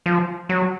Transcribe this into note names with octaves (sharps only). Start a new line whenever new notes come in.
F3
F#3